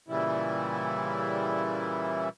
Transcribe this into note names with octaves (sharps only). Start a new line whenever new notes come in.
A#2 C#3 E3 G3 E4